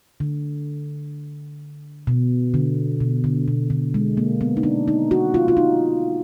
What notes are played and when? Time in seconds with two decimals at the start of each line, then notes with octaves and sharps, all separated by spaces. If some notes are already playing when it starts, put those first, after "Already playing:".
0.20 D3
2.07 B2
2.54 D3
3.00 B2
3.24 D3
3.48 B2
3.70 D3
3.94 G#3
4.17 A#3
4.41 B3
4.57 D#4
4.63 D4
4.88 D#4
5.11 F#4
5.34 F4
5.48 F4
5.57 D#4